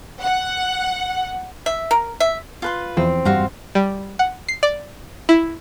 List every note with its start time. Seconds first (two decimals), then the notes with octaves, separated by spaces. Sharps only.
0.21 F#5
1.66 E5
1.91 A#4
2.20 E5
2.62 F4 B4 C6
2.97 E2 E3 F3 C4
3.25 G2 G3 F#4 C5 F5
3.75 G3
4.19 F#5
4.48 C7
4.63 D5
5.29 E4